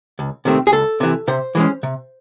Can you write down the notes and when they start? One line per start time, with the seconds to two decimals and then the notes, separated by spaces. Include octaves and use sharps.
0.19 C#2
0.45 C3 D#3 A3 C4
0.67 G#4
0.72 C#2 A4
1.00 C3 E3
1.28 C3 C5
1.55 E3 G#3 C#4
1.83 C3